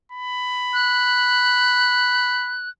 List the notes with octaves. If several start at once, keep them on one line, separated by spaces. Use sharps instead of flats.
B5
F#6